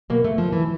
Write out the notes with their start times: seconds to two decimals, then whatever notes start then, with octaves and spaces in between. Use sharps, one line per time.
0.10 B2 A#3
0.24 A3
0.38 F3
0.52 E3